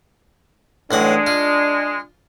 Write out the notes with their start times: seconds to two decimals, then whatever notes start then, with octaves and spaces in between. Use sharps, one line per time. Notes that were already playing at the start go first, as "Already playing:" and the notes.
0.91 A1 F#3 G#3 D4 F#5
1.27 F4